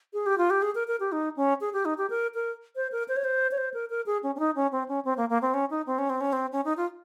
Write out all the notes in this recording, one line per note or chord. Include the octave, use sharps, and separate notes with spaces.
G#4
G4
F4
G4
G#4
A#4
A#4
G4
D#4
C#4
G#4
G4
D#4
G4
A#4
A#4
C5
A#4
C5
C#5
C5
C#5
C5
A#4
A#4
G#4
C#4
C#4
D#4
C#4
C4
C#4
C4
A#3
A#3
C4
C#4
D#4
C4
C#4
C4
C#4
C4
C#4
D#4
F4